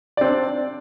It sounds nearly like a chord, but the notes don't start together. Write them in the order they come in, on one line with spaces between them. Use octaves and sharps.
D5 C4 D4